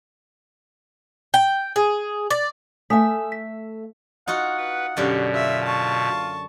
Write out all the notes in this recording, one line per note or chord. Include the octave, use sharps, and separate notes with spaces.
G5
G#4
D5
A3 E5 G#5 D#6 B6
B6
D#4 F4 F#4 F#5
B4
F#2 B2 D3 G4 F5
F4 E5
A5 C#6